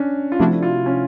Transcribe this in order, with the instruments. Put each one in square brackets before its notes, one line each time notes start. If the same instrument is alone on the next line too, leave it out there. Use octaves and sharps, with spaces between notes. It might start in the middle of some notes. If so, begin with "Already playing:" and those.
Already playing: [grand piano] C#4 D4
F4
[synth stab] C3 F3 A3 D4 F#4 [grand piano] E4
[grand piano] F4
C#4